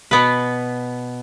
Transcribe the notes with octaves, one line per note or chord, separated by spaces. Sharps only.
B2 B3 B4